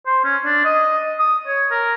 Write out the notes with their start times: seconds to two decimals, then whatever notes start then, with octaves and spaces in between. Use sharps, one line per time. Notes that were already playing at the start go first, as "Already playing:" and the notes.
0.06 C5
0.24 C#4
0.45 D4
0.64 D#5
1.19 D#6
1.47 C#5
1.71 A#4